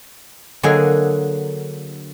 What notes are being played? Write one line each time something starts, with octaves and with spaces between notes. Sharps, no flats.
D3 F#3 A#3 G#4 D#5 G#5